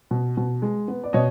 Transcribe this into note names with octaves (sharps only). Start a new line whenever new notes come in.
B2
B2
G#3
B3
D5
B2 C#5 D#5